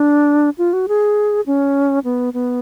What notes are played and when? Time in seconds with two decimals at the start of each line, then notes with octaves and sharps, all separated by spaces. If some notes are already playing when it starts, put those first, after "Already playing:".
Already playing: D4
0.58 F4
0.73 F#4
0.88 G#4
1.47 C#4
2.04 B3
2.34 B3